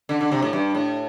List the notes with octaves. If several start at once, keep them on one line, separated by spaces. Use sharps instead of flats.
D3
D3
C3
A2
G2
A2